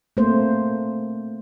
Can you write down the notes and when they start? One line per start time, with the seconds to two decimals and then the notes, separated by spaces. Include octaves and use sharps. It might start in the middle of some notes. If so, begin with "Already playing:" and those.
0.17 A3 A#3 C4 C5